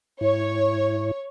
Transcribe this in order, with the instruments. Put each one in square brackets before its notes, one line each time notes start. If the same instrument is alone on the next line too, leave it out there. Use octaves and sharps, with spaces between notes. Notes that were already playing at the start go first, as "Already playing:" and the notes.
[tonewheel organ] G#2 E4 [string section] C#5